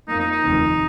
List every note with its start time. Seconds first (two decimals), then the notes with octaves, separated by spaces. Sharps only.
0.08 A#3 D#4
0.11 F2 F3
0.19 D#4
0.31 D#4
0.42 F1 D#2 D#3 C4